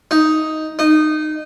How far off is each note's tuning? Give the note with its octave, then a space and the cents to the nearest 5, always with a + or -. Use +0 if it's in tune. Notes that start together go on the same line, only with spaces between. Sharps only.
D#4 +5
D#4 -20